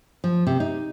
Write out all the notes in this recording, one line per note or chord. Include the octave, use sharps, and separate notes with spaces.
F3
C3
D#4